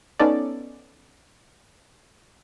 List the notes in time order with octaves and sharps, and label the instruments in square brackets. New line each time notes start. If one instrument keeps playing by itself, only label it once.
[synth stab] B3 C#4 D#4 A4 D5